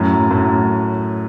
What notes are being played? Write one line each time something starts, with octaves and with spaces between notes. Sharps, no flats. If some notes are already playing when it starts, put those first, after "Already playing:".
Already playing: F#2 A2
F#2 A2